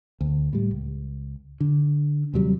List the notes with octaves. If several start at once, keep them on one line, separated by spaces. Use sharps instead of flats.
D2
A2 G3
C#2
D3
D#2 C3 F#3 G3